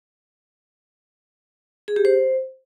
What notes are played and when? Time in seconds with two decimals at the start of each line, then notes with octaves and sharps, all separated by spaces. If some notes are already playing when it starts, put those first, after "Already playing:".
1.88 G#4
1.96 G4
2.05 C5